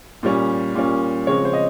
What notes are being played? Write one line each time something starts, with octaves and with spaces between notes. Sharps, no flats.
A#2 G3 C#4
A#2 G3 C#4
C#3 F3 G#3 C4 C#5
C5
D#5